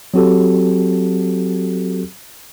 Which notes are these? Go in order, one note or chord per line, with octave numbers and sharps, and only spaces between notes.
F#3 C4 F#4 G4 A4